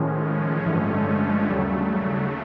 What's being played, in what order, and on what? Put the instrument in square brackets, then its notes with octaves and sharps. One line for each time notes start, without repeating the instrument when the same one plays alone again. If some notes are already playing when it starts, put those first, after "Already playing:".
Already playing: [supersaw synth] A2 F3 G#3 C#4 [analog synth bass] D#3
[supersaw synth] G2 D3 F3 A3 C#4 [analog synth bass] E3
[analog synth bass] G#3
G#3
G#3
G#3
[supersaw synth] D#2 C#3 F#3 A3 [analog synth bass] G3